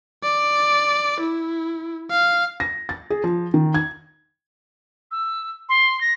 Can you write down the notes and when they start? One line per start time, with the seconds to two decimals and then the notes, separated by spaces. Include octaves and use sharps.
0.23 D5
1.20 E4
2.10 F5
2.60 A#6
2.89 A6
3.10 G#4
3.24 F3
3.54 D#3
3.74 G#6
5.11 E6
5.69 C6
6.01 A#6